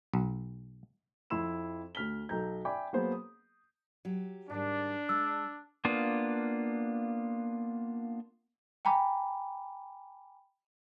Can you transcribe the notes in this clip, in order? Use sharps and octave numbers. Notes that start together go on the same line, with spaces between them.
B1
F2 E4 C6 E6 E7
D2 F6 B6 G7
B1 A4 A#5 G6
D5 E5 G5 G#5 B5 D6
F#3 A#3 B3 G#4 C5
D#6
F#3 G4
G#2 D#3 G3 D4
G#3 E6
A#3 B3 D4 F4
G5 G#5 A#5 B5 D6